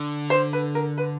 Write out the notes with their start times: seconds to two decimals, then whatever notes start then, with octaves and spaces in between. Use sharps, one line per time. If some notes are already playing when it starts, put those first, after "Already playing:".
Already playing: D3
0.30 C5
0.53 B4
0.75 A#4
0.98 B4